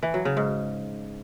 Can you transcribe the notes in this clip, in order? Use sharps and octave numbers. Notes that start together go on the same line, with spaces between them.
E3
F#3
C#3
G#2